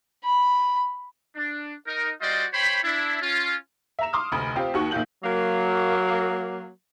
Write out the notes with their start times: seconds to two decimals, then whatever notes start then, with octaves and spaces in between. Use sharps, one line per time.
0.24 B5
1.36 D4
1.87 D#4 A#4
2.21 G3 F4 F#4 C5 D5 D#5
2.54 C5 C#5 G5 B5
2.83 D4 E4
3.22 C#4 F4
3.99 E5 A#5 E7
4.13 C6 D6 D#6 F6
4.32 F1 D2 B5 D#6
4.56 C4 F4 G4
4.74 D#2 D#3 F#4 C#6
4.91 A#1 D#3 F4 G6 F#7
5.24 F#3 A#3